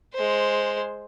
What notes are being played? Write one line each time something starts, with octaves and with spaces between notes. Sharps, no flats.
G#3 C5